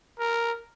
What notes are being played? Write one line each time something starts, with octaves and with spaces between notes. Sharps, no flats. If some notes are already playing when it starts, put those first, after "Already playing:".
A#4